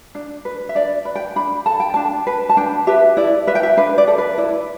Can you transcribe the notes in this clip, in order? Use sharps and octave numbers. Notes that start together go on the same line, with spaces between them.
D4
B4
E5
D4 D5
B4
G5
D4 B5
A4 A5
G5
D4 A5
B4
A5
D4 G5
G4 B4 E5
E4 D5
B4 E5
G5
E5
D4 B4
D5
A4
B4
E4 D5